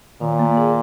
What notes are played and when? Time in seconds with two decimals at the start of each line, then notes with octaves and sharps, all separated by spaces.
0.21 A#2 D#3
0.39 A#3
0.57 G#4